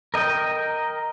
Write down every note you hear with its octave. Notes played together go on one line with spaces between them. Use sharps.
A#4 D#5 G5